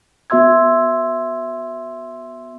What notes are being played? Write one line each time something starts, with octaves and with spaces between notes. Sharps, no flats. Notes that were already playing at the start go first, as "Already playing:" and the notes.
B3 F#4 E5 C6 E6 G#6